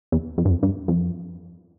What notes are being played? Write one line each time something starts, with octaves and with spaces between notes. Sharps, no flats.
E2
F2
G2
F2
G2
F2